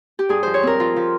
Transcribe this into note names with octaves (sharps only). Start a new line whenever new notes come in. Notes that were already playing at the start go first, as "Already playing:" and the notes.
G4
G2 G#4
F3 C5
C#5
C4 A#4
F3 F4
F3